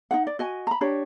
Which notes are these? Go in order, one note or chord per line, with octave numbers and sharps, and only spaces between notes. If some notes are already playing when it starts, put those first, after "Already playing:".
D#4 F#4 F#5
D5
F#4 D#5 G#5
A#5 B5
D4 G4 C#5